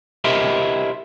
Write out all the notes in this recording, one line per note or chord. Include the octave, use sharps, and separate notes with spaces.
E4 G4 A#4 C5 D#5 E5